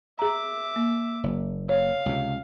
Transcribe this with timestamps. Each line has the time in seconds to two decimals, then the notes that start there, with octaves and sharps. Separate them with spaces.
0.19 G#4 E5 A#5 D6
0.76 A#3
1.23 F#1
1.69 C#5 F5
2.06 C#2 C3